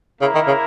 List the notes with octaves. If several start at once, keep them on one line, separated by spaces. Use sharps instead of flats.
C#3 A#3 E4 A#4
D#3
C#3